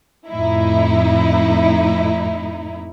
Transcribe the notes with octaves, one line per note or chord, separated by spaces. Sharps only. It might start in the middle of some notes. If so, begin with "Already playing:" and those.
F2 A2 D#4 E4